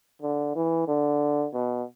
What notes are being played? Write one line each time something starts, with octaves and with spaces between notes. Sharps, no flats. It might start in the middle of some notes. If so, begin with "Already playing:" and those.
D3
E3
D3
B2